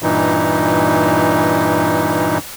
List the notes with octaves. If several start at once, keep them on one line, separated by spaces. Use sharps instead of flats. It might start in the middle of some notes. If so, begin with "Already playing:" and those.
G2 A#2 E3 D#4